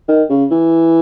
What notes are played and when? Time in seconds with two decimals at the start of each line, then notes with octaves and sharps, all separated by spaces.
0.08 D#3
0.29 C#3
0.51 E3